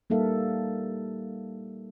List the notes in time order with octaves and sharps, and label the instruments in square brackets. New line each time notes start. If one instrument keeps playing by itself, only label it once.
[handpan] G3 A#3 D#4 A4 E5 F5